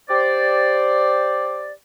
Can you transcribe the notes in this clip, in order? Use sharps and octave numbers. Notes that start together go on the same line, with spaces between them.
G4 C5 D5